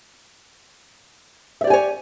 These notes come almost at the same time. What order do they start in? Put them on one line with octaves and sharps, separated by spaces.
E5 D5 G4 G#5 C#5